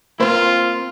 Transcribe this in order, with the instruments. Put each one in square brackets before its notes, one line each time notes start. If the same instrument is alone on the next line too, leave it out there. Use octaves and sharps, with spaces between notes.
[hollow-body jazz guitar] A#3 C4 [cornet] F4 [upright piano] A#4 C5